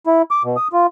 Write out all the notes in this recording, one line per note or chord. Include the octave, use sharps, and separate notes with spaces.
E4
D6
B2
D#6
F4